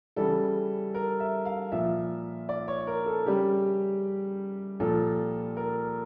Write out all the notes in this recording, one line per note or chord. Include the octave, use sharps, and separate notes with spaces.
C#3 E3 G3 A4
A#4
E5
F5
A#2 F3 E5
D5
C#5
A#4
A4
C#3 G3 G4
A#2 F3 A4
A#4